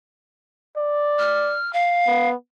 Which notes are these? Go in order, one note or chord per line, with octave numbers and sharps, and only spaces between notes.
D5
F6
F5
B3